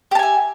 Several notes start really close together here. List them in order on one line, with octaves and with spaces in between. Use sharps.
G4 A5 G#5 E5